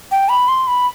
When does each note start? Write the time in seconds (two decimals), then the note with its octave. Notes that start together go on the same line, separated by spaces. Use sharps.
0.11 G5
0.29 B5
0.48 C6
0.67 B5